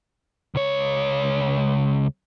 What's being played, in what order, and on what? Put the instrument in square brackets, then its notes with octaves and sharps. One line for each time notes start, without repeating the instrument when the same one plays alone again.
[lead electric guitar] C#2 C#5